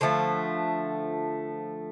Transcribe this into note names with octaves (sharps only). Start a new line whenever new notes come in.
D3 F3 A3